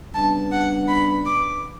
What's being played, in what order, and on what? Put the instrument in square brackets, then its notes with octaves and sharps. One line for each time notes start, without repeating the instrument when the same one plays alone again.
[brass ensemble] C#3 G3 B3 D4 [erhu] A5
[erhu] F#5
B5
D6